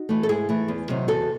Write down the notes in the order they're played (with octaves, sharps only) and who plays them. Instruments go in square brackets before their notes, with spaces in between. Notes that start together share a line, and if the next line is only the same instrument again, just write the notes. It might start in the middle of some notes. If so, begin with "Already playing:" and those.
Already playing: [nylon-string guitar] D#4 F#4
E3 A3
A4
G#2 E4 G#4
E3 A3
E2
C3 D#3 F#3
E2 F#4 A4